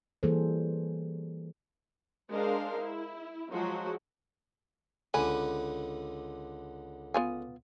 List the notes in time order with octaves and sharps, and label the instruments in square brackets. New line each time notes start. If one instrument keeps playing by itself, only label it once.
[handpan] E3 G3 A#3 G#4 A4 C5
[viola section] G#3 D4 A#4 C5 F5
E4
F3 F#3 G#3 F#4
[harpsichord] C#2 D3 B4 [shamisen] G#5
[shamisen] B3 F4 G#5